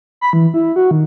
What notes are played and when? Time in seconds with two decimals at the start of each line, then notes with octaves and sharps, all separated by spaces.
0.21 B5
0.33 E3
0.54 E4
0.76 F#4
0.91 D#3